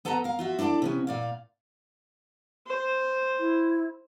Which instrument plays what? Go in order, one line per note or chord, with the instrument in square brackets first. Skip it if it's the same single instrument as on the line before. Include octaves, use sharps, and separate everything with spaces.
[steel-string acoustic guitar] B3 A4 B4 D#5 A5 A#5
A#4 F5
F4 F#4 E5
D4 E4 A4 B4 D5
C3 B3 C#4
A#2 D5 F5
[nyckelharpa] C5
[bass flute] E4